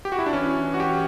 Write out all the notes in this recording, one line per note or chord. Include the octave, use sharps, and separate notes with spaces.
G4
F#4
E4
D4
E3 C#4
E3
F#4
G4